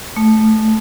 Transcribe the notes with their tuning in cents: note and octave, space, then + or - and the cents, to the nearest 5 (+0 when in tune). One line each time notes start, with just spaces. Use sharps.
A3 -10